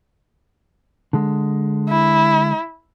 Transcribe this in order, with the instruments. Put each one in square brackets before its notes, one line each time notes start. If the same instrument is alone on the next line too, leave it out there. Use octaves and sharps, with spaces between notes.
[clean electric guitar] D3 G#3
[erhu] E4